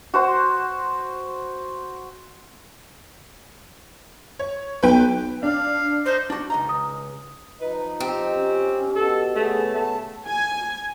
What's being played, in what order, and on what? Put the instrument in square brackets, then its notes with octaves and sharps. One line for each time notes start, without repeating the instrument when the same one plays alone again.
[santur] F#4 C5 C6
[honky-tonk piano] C#5
[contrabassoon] B1 [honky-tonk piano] B4 G5
[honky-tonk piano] D4 [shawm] F5
[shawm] D#4 [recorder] C5
[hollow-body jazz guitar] D4 F#4 [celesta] D#4
[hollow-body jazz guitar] C#2 D#5 A#5
[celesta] D#6
[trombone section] F3 D#4 [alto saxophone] B4
[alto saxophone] C4 [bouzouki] G4
[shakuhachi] C#4
[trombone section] B2 [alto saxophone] A4
[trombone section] C#3 B3 [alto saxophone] A3 [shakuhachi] G#4
[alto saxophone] A3 [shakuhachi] A5
[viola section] G#5